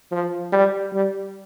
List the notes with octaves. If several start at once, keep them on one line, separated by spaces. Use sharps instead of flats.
F3
G3
G3